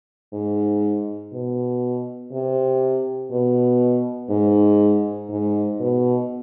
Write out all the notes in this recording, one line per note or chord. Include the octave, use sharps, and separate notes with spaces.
G#2
B2
C3
B2
G#2
G#2
B2